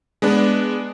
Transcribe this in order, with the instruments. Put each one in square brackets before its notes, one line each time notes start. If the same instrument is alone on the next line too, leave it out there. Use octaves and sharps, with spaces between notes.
[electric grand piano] G#3 B3 D4